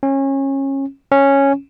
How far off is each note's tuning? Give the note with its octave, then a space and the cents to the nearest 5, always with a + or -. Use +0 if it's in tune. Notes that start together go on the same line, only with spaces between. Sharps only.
C#4 -25
C#4 -5